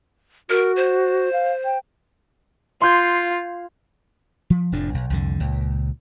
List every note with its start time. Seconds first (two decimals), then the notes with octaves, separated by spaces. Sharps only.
0.50 F#4 A#4
0.76 C5
1.33 F5
1.65 G5
2.82 F4 C6 G6 G#6
4.50 F3
4.72 F1 F2 A2 D4
4.94 B1
5.10 C2 F2 D3
5.40 C#2 A#2